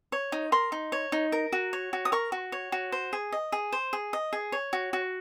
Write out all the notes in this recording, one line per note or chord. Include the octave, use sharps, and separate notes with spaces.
C#5
D#4
A#4 C6
D#4
C#5
D#4
A#4
F#4
C#5
F#4
D#6
A#4 C#6
F#4
C#5
F#4
C5
G#4
D#5
G#4
C5
G#4
D#5
G#4
C#5
F#4
F#4